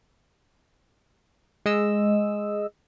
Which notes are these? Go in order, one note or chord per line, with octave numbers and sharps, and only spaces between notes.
G#3 D#5 E6